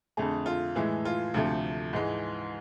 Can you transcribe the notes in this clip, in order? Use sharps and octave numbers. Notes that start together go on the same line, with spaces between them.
F2 D3 A3 G#4
F4
A2 E3 G#3 E4
F4
D2 C3 F3 A3
G#2 E3 G#3